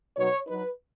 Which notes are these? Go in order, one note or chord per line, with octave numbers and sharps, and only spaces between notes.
B2 F#3 B3 D#4 C#5
F#3 D#4 B4